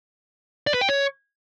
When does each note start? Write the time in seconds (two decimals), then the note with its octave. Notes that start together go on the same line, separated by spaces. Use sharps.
0.67 D5
0.74 B4
0.81 G5
0.89 C#5